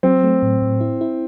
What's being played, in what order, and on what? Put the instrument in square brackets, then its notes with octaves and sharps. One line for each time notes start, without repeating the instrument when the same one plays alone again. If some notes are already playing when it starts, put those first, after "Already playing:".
[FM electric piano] F#3 [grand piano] C4
[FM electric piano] A3
A2
A2
E4
E4